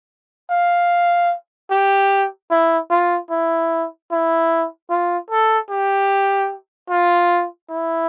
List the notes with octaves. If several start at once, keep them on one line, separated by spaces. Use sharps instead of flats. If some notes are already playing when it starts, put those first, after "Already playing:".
F5
G4
E4
F4
E4
E4
F4
A4
G4
F4
E4